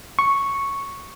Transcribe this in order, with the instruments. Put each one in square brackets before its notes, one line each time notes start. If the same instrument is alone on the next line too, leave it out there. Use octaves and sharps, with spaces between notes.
[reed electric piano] C#6